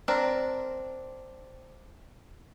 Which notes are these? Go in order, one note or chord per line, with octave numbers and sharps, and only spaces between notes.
C4 D4 A#4